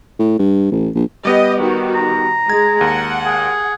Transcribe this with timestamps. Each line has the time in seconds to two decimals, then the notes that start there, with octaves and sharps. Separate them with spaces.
0.19 A2
0.39 G2
0.71 A1
0.95 A#1
1.25 G3 B3 G4 D#5
1.57 D#3 F#4
1.95 A#5
2.50 G#3 G#6
2.81 D#2 F#5
3.26 G#4